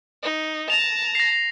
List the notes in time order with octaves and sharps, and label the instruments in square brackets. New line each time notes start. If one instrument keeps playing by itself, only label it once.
[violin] D#4
[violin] A5 A#5 [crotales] F7
[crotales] A#6 C7